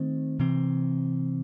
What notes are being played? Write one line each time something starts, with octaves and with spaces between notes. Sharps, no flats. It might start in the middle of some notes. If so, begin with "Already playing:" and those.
Already playing: D#3 A3 C4
C3 E3 C4